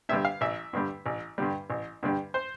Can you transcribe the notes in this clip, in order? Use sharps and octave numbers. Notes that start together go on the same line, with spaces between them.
G2 D3 G3 E5
F5
A1 E5
G2 D3 G3
A1
G2 D3 G3
A1
G2 D3 G3
C5